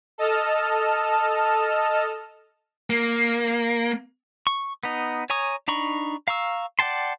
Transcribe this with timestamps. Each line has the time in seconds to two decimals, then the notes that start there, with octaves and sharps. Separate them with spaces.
0.18 A4 D#5 A5 F6 E7
2.90 A#3
4.47 C#6
4.83 B3 D#4
5.30 C#5 G#5 A#5 C#6 D#6
5.68 D4 D#4 A#5 B5 C#6
6.28 F5 A#5 C#6 E6
6.79 D5 F#5 G5 A5 C6